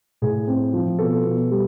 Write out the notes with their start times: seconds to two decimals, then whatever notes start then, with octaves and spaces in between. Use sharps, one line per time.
0.22 A2 G#4
0.48 C4
0.74 F3
0.99 B2 A4
1.24 B2
1.51 G3